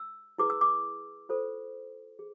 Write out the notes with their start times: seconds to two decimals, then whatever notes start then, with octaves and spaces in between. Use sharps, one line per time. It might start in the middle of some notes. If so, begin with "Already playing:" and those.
Already playing: E6
0.38 E4 G#4 B4 D6
0.50 E6
0.61 D6
1.29 F4 A4 C5
2.19 G#4